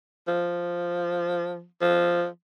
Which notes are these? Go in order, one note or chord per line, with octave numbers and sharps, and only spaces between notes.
F3
F3